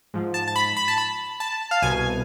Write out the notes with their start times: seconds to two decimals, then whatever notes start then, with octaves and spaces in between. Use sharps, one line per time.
0.14 G#2 F3
0.34 A5
0.48 A5
0.56 B5
0.77 B5
0.88 A5
0.98 B5
1.40 A5
1.71 F5
1.82 C2 B2 G#5